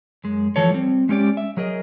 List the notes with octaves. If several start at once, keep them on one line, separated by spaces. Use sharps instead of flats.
F#2 G#3
E3 F3 A4 C#5
G3 C4
G#3 C#4 G4 D5
E5
F#3 G#4 A#4 D#5